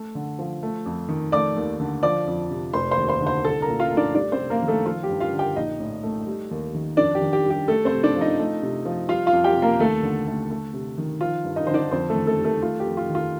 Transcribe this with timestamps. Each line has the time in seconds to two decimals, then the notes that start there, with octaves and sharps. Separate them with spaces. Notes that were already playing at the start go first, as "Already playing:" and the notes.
Already playing: A3
0.15 D3
0.39 F3
0.63 A3
0.86 F2
1.09 D#3
1.32 A3 D5 D6
1.56 D#2
1.80 D3
2.03 F3 D5 D6
2.27 F2
2.51 C3
2.73 F1 C5 C6
2.91 C5 C6
2.97 D#2
3.09 C5 C6
3.21 D3
3.26 C5 C6
3.45 C2 A4 A5
3.62 A#4 A#5
3.68 A#2
3.80 F4 F5
3.92 A3
3.97 D4 D5
4.15 G3 D4 D5
4.32 C4 C5
4.39 C3
4.50 A#3 A#4
4.62 D#3
4.68 A3 A4
4.86 F3 F4
5.03 G4
5.09 G2
5.20 F4 F5
5.32 D3
5.39 G4 G5
5.56 A#1 D#4 D#5
5.80 A2
6.03 A3
6.27 G3
6.51 D#2
6.75 D#3
6.97 F2 D4 D5
7.15 G4
7.22 D#3
7.33 G4
7.44 G3
7.50 G4
7.68 A3 A4
7.85 C4 C5
7.92 C3
8.04 D4 D5
8.16 F3
8.21 D#4 D#5
8.39 A3
8.62 C3
8.85 F3
9.09 G3 F4 F5
9.26 F4 F5
9.33 F2
9.44 G4 G5
9.57 C3
9.62 A#3 A#4
9.79 D#2 A3 A4
10.03 D3
10.27 A3
10.51 A3
10.74 C3
10.98 D#3
11.21 F3 F4
11.45 G2
11.56 D#4 D#5
11.67 D3 C5
11.74 D4 D5
11.91 F2 C4 C5
12.09 A3 A4
12.15 D#3
12.27 A3 A4
12.38 G3
12.44 A3 A4
12.62 A3 F4
12.80 G4
12.86 F2
12.97 F4
13.10 D#3
13.15 F4